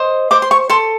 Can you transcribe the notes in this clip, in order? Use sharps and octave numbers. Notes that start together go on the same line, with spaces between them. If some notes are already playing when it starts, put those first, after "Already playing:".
Already playing: C5 D#5
C5 D6
C6
C#6
A4 C6